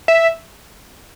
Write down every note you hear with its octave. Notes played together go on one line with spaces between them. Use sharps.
E5